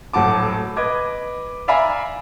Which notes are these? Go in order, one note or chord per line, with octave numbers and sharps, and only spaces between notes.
D#1 A2 F#3 F#4 A5 D6
B4 D#5 D6 G#6
D5 E5 F5 G#5 A#5 B5